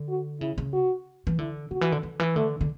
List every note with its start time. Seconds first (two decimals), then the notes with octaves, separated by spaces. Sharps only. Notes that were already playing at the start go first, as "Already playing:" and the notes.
Already playing: D3
0.09 F#4
0.41 C#3 E4
0.58 C#3
0.73 F#4
1.27 E3
1.38 D3 E4
1.71 D3 F#4
1.81 E3
1.92 D3
2.03 D3
2.20 E3
2.36 D3 A3
2.61 D3